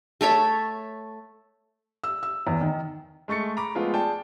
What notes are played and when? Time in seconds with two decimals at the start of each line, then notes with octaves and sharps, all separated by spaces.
0.21 A3 A4 C#5 E5
2.04 E6
2.23 E6
2.47 E2
2.61 D#3
3.28 G#3 A3 C#6 A6 C#7
3.57 A#5 B5 D6
3.75 F3 G#3 A3 B3 F4
3.94 G#4 D5 G5 A5